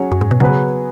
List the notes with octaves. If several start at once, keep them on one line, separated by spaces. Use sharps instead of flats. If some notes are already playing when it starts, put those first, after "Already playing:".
Already playing: F#3 C#4 G#4 C#5
F#2
G#2
B2
C#3 F#3 B3 G#4 B4